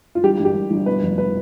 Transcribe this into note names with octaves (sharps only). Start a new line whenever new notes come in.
F4
G1 G4
G1 G4
G1
G1
B2 B4
F1
B4